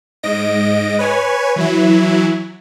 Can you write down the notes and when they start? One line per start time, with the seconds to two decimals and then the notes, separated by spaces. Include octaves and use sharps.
0.23 G#2 D#5 A#6 D7
0.99 B4 C#5 G#5
1.56 E3 F#3 E4